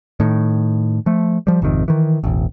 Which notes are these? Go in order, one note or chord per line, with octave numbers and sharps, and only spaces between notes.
A2 D#3
F3 A3
F3 G3
G#1 F2 C3 D#3
D#3 E3
E1 A1